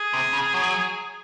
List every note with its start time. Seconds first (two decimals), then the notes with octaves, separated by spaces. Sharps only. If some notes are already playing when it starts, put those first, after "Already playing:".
Already playing: G#4
0.13 C3
0.33 C#3
0.54 F#3